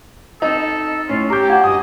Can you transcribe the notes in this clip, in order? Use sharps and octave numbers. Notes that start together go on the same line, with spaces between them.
C4 D#4 A4 A#5
A2 C#4 F4
G4 A#5 D6 G6
F4 F#4 G#5
G2 D#5 D#6